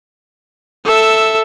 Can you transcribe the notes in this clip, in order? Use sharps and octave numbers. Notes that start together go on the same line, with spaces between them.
A4 E5